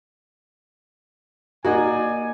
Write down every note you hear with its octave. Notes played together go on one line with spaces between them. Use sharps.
A#3 D#4 F#4 D5 G#5